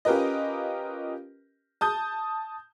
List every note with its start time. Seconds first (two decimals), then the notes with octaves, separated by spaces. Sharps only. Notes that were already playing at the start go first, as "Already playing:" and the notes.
0.05 C#4 F4 G4 A#4 B4 D#5
1.81 A5 D#6 G6